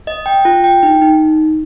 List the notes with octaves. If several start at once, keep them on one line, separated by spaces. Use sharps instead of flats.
D#5
G5
F4
G5
D#4
D#4